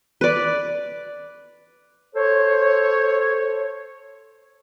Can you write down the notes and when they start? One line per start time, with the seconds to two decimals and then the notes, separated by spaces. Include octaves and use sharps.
0.21 B4 D5
2.16 A4 C5 C#5